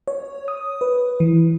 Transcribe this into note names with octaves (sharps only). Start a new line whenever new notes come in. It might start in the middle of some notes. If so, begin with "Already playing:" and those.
C#5
D#6
B4
E3